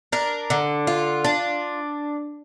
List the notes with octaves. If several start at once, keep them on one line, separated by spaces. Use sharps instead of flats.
D4 A#4
D3
F4
D4